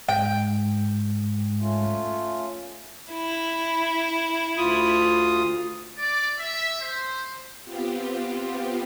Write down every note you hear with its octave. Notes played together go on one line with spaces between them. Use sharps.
G#2 G5
A3 C#4 F4
E4
D2 F4 D#6
D5
E5
C5
B3 C4 F4 G4